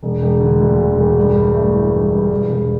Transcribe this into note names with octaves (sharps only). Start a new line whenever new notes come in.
E1
E1
D3
D2
E1
E1
G2
G2
A3
E3
G2
G2
E1
E1